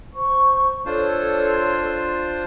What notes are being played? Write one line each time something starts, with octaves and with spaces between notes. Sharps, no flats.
C5 C#6
D4 F4 A4 C5 C#5